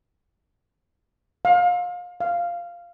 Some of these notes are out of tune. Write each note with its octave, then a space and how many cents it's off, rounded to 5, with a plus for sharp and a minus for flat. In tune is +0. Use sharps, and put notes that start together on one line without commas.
F5 +30
F5 -5